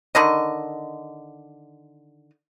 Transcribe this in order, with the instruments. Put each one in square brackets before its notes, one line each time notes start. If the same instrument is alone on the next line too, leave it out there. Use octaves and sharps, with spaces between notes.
[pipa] D3 D#3 D#5